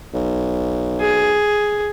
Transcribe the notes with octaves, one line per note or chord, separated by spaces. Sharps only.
B1
G#4